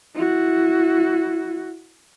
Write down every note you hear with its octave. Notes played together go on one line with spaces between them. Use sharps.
E4 F#4